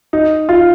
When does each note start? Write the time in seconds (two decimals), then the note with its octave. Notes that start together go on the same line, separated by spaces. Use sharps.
0.13 D#4
0.49 F4